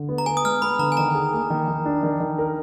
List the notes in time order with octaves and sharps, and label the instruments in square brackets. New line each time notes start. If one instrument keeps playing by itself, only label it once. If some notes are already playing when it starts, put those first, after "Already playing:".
Already playing: [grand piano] D3
B3
[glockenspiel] A#5
[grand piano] B3 [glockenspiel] G#5
[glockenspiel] D#6
[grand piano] G#3 [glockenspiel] F6
[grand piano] B3 [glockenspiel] B5
[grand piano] D3 [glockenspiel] A#5
[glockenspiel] G#5
[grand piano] D#3 [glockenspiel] A#5
[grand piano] G#4
A#3
D#3
D#3
D4
D#3
D#3
A#4